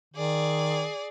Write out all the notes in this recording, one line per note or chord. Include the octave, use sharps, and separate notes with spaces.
D#3 G#4 D5